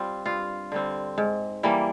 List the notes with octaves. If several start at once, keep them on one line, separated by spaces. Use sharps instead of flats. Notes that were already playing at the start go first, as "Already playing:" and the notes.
Already playing: G3 C4 F4
G2 F4
D3 G3 C4
G#2
E3 G3 A#3